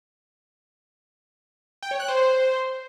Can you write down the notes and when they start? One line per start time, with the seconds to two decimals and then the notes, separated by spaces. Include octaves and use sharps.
1.83 G5
1.91 C#5
2.00 F#6
2.08 C5